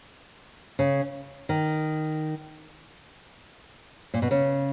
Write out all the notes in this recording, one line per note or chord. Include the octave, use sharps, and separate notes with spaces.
C#3
D#3
A#2
B2
C#3